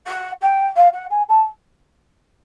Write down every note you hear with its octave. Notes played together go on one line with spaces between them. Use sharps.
F#5
G5
F5
F#5
G#5
A5